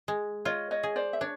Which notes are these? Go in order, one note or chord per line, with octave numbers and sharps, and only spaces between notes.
G#3
F4 C#5 D#5
C#5 D#5
G#4
C5 D5
E5
D4 C#5